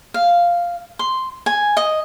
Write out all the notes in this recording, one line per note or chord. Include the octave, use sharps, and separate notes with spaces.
F5
C6
G#5
D#5